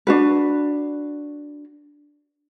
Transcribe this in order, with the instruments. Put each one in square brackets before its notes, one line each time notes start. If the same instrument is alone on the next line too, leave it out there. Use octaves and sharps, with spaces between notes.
[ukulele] D4 F#4 B4